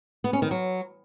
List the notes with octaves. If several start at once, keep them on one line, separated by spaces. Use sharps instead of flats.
B3
C#4
D#3
F#3